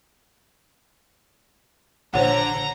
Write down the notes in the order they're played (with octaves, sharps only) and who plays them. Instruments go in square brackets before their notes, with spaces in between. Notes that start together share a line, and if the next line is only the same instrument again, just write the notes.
[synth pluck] A#1 [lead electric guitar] D3 [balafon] C5 C#5 F#5 [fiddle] A#5